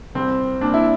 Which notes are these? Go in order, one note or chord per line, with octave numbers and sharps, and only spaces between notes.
C2 C4
A#2 D4
E4